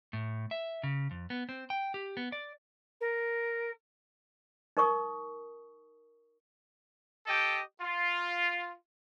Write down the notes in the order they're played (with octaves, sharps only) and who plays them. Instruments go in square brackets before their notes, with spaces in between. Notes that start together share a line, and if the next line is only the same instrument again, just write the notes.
[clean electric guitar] A2
E5
C#3
F2
B3
C4
G5
G4
B3
D5
[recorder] A#4
[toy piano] D#4 A#4 C#6 D#6
[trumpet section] G4 A4 D#5 G5
F4